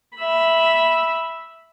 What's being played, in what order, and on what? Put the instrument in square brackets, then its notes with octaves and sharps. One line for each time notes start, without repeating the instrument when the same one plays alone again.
[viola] E5 B5